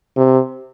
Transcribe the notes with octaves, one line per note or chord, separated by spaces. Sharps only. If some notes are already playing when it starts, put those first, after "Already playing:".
C3